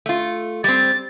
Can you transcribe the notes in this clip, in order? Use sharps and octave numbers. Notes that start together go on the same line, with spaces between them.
A3 F4
G3 C4 A6